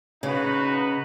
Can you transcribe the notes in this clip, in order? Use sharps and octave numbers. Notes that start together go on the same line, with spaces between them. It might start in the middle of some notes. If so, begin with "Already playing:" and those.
C#3 D#4 F#4 B4